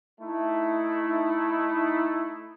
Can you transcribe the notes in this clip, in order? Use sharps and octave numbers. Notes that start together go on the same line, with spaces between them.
A3 D#4 E4